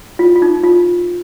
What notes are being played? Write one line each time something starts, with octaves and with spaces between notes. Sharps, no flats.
F4
F4
D#4
F4